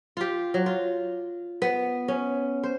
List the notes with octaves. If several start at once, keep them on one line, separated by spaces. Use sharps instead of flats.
F4 G4
F#3
F4
B3
C#4
C5